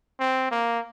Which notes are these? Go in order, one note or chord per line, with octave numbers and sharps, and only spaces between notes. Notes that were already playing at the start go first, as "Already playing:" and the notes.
C4
A#3